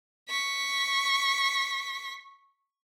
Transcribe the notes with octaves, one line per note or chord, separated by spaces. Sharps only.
C#6 B6